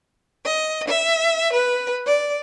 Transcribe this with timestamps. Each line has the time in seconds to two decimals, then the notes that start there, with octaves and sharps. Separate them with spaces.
0.45 D#5
0.88 E5
1.54 B4
2.07 D5